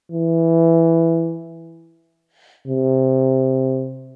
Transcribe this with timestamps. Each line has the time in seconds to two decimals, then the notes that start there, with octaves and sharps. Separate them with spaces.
0.12 E3
2.67 C3